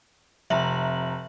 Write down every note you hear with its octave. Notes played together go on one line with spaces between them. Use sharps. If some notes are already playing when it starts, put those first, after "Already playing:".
F1 E5 A#5 F#7